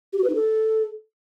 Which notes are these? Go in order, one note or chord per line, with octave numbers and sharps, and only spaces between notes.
G4
F#4
B4
D#4
A4